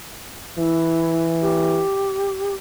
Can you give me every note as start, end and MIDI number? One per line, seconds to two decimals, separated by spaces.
0.58 1.82 52
0.58 1.23 64
1.41 2.54 67